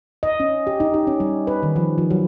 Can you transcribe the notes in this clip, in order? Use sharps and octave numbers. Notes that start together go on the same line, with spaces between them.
D#5
C#4
G4
D#4
G4
C#4
G3
B4
D#3
F3
F3
F#3